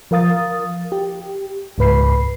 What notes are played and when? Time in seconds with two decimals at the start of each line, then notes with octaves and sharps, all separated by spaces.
0.11 F3 A#4 F5 D#6 A6
0.92 G4
1.78 C#2 G#2 B4 B5 C7